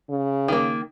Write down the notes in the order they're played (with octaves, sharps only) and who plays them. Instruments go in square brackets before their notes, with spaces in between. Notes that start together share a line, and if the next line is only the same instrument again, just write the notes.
[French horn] C#3
[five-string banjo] D#3 A#3